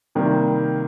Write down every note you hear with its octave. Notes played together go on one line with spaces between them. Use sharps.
C3 D#3 G3 A#3